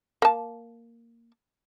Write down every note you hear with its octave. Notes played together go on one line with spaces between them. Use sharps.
A#3 A5